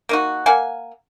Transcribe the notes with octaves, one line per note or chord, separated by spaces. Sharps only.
A#3 D#4 F#4
A#3 F5 F#5 G#5